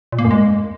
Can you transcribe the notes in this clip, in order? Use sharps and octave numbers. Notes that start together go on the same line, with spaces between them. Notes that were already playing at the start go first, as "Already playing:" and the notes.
A#2
A#3
F#2
G#3